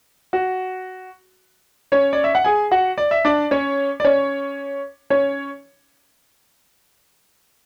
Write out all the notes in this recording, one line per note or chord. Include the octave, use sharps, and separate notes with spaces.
F#4
C#4 C#5
D5
E5
F#5
G#4 G#5
F#4 F#5
D5
E5
D4 D5
C#4 C#5
D5
C#4 C#5
C#4 C#5